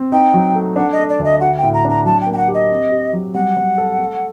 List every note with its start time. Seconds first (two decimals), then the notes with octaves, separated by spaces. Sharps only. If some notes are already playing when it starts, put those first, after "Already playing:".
Already playing: C4
0.12 D#4 G5
0.34 F#3
0.55 A3
0.76 D4 F#5
0.92 D#5
0.99 A3
1.09 D5
1.19 D2
1.24 D#5
1.41 F#4 F#5
1.58 G5
1.63 A2
1.74 A#5
1.85 D4 A#5
2.05 F#3 A5
2.21 G5
2.27 A#3
2.33 G5
2.37 F#5
2.48 G4
2.54 D#5
2.70 C4
2.91 G4
3.13 F#3
3.34 G3 F#5
3.57 G3
3.78 A4
3.99 A3